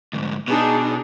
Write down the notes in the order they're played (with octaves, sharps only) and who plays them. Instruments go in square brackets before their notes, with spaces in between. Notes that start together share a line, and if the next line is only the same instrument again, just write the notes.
[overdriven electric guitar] D2 G#2
[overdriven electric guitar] B2 [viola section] D4 D#4 G#4